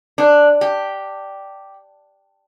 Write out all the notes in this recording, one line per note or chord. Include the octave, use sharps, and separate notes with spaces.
D4
G4